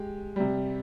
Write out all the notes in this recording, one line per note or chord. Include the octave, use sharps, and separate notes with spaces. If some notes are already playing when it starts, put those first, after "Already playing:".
Already playing: G#3 G4
C3 G3